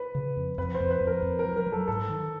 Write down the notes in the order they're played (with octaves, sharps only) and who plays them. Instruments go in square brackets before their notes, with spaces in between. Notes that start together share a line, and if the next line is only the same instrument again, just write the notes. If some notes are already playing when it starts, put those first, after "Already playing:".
Already playing: [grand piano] B4
[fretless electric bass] C#3
F2
[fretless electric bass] F2 [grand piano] B4
[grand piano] C5
[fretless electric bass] F2
[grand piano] B4
[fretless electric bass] F2
[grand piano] A#4
[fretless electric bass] F2
[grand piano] A#4
[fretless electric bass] F#3
[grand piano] A#4
[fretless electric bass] F#3
[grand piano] A4
[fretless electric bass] G#2 [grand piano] A4
[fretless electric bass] D#3